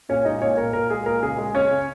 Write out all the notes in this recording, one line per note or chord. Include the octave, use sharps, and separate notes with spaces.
A#2 C#4 C#5
G#3 D#4 D#5
A#2 C#4 C#5
A#2 A#4
A#2 A#4
G#3 G#4
A#2 A#4
C#3 G#4
G#3
C#3 C#4 C#5
C#3